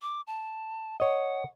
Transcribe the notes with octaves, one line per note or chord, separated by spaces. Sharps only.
D6
A5
C#5 D#5 F#5